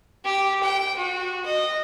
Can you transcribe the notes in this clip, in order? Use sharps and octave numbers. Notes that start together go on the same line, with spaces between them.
G4
G5
F#4
D#5